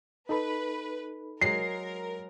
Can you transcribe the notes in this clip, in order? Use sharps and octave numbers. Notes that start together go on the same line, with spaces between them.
D#4 A4 B4 B5
F#3 G#3 A#4 C7